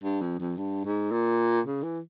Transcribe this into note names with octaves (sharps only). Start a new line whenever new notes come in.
G2
F2
F2
G2
G#2
A#2
C#3
E3